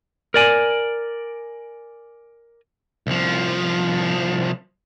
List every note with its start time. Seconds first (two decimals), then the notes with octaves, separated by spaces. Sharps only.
0.34 A#4 D5 G#5
3.07 C2 F3